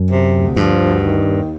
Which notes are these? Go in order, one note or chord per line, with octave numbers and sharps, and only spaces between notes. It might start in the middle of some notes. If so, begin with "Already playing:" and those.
Already playing: F#2
C3
D2
G2 F3
D2
D#3
D#2